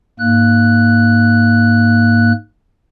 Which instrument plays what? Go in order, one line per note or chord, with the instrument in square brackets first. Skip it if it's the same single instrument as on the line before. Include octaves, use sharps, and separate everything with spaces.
[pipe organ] G#2 A#3 F#6